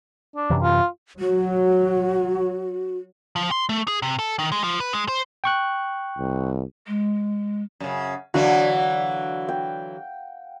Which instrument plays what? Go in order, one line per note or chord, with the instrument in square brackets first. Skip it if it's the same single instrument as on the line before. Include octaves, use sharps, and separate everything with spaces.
[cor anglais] D4
[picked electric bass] F#2 C3 E3
[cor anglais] F4
[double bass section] F#3 [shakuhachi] F#4
[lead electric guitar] F3
C6
A3
G#4
C3
A4
D#3
G#3
F3
B4
G#3
C5
[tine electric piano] G5 C#6 F#6
[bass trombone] C2
[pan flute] G#3
[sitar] F#2 C#3
[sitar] D3 E3 F#3 [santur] F#4 F5
[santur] G5